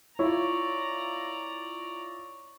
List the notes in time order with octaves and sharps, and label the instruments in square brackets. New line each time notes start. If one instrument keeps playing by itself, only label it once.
[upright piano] E4 F4 [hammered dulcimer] C#5 [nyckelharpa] D5 A#5